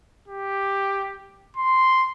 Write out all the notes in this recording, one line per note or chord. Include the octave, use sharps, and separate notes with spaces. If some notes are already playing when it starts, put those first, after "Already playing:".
G4
C6